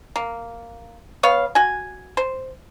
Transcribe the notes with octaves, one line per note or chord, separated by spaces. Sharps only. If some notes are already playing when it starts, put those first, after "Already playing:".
A#3
B3 C#5 F5
F#4 G#5
C5